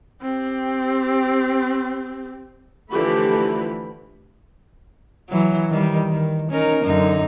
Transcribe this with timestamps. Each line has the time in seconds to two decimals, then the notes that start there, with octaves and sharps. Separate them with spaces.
0.21 C4 G4
2.91 D3 E3 F3 A3 G4 B5
5.29 E3 F#3
5.70 D#3 G3
6.10 D#3
6.50 C#4 D#4 A#4
6.84 F#2 D3 D#4